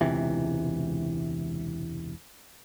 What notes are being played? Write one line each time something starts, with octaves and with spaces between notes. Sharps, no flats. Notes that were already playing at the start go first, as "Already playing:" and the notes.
E1 C#2 C3 E3